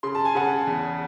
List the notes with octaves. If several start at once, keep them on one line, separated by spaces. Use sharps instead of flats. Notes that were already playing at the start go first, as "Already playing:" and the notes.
C#3 C6
A5
G#5
C#3 F#5 A5
E2